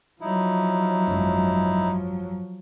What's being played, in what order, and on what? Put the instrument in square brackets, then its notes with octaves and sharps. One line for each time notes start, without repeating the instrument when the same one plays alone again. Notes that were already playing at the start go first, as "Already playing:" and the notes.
[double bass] F3 F#3 [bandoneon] D#4 E4
[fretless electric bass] G#1 F#2